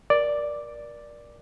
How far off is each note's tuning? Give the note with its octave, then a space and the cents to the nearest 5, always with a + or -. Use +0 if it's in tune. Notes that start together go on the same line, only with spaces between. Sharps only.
A#4 +30 D5 +0